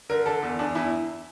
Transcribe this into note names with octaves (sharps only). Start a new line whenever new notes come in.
D3 A#4
D3 A4
E2
E2 D4
E2 E4